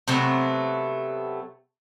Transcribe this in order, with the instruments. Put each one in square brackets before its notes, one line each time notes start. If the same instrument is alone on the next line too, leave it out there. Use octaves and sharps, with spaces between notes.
[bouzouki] C3 F#3 A3 B3